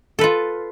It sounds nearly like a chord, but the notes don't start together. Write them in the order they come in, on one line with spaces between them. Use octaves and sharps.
A4 B4 F4